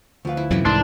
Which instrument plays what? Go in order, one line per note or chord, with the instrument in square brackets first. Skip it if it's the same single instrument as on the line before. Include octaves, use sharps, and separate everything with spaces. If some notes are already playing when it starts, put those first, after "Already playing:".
[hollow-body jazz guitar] D2 F5 [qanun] F3 B4
[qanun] E4
[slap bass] F#2 C3 F#3 [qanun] E3 A3 E4
[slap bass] C2 G#2 D#3 [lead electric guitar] D4 [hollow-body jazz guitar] C6